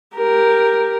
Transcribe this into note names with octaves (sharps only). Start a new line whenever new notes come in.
G4 A#4